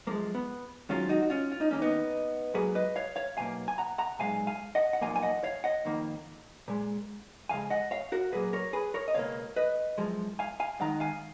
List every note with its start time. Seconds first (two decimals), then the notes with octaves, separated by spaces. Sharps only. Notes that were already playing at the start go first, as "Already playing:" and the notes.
0.07 F#2 F3 G#3 A#3
0.35 B3
0.89 G#2 D#3 F#3 C#4 F4
1.09 D#4 F#4
1.22 F#4
1.30 C#4 F4
1.52 F4
1.61 D#4
1.71 D#2 D#3 F#3 A#3 C#4
1.82 B3 D#4
2.54 G#2 F#3 A#3 G#4 B4
2.75 B4 D#5
2.96 C#5 F5
3.16 C#5 F5
3.37 B1 B2 A#3 F5 G#5
3.68 G#5
3.78 F#5 A#5
3.98 F#5 A#5
4.19 B1 A#2 G#3 F5 G#5
4.47 F5 G#5
4.75 D#5 F#5
4.93 F#5
5.01 B1 A#2 F3 A#3 F5 G#5
5.16 G#5
5.22 D#5 F#5
5.44 C#5 F5
5.64 D#5 F#5
5.85 F2 D#3 A#3
6.68 A#2 G#3
7.49 F2 C#3 G#3 F5 G#5
7.70 D#5 F#5
7.91 C#5 F5
8.12 F#4 A#4
8.32 A#2 F#3 A#3 G#4 B4
8.53 A#4 C#5
8.73 G#4 B4
8.94 A#4 C#5
9.08 D#5
9.15 C#2 B2 A#3 C#5 F5
9.56 B4 D#5
9.98 F#2 F3 G#3
10.39 F5 G#5
10.60 F5 G#5
10.80 F#2 D#3 G#3 F#5 A#5
11.00 F5 G#5